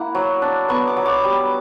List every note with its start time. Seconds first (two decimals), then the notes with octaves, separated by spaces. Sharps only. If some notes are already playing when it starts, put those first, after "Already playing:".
Already playing: A#3 E4 F#5
0.15 F#3
0.42 D4
0.69 B3 C#6
0.87 D6
0.97 F#3
1.06 D6
1.24 G3